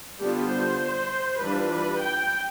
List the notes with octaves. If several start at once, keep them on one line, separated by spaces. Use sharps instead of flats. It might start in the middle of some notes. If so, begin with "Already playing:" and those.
D3 G3 B3 D4 F4 G4
C5
E3 G3 D4 F4 B4
B4
G5